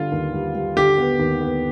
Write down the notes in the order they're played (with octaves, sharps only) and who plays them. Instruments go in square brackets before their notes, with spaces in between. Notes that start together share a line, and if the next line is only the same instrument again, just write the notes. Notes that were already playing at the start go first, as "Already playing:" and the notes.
Already playing: [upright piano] D3 G3 B3 [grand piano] F4
[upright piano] D#2
G3
G3
[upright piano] D3 [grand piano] G4
[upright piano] B3
D#2
B3